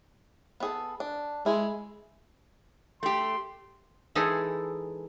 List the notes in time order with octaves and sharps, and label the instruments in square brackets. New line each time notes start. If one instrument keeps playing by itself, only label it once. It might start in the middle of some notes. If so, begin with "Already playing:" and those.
[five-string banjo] B3 G#4 A4
D4
[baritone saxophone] G#3 [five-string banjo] E4
[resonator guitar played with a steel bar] A3 G4 [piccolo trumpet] C6
[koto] E3 G#3 D#4 E4 G#4 A4